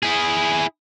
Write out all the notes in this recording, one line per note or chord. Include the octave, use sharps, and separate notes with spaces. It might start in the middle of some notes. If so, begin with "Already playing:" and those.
E4 G#4